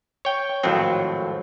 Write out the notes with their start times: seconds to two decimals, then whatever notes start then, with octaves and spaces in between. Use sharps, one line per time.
0.25 C#5 G5
0.63 G#1 F2 A2 F#3 C4